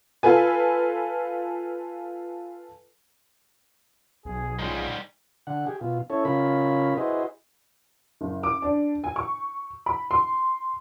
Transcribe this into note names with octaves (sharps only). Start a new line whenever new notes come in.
F4 A4 B4 G#5
B1 G#4
G#2 C#3 G3 F4 G#4
D3 F#5
G4 G#4
B2 F4
C#4 E4 A4 C#5
C#3 C#4 F4 A#4 B5
E4 F#4 G#4 B4 C5 D#5
F#1
D6
D4
G#5
C#6
B5
C6